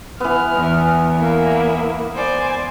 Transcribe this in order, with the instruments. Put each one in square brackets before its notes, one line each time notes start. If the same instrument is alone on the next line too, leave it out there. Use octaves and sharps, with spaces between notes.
[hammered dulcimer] E3 B3 [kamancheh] F6
[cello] E2
[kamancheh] A#3 E4
[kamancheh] C5 G#5 [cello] D5